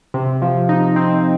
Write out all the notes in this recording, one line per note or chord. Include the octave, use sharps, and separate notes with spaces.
C3
F3
D#4
C4